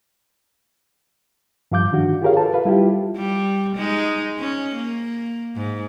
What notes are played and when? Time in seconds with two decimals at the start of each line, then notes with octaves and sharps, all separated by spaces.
1.72 G2 F3 F5 D6 G6
1.92 D#3 D4 F#4
2.22 F4 G4 G#4 A#4 C#5 F5
2.37 A4 B4 A5
2.54 B4 F5
2.65 G3 E4 F4 G4
3.16 G3
3.76 G#3 D#4
4.39 C#4
4.75 A#3
5.56 G#2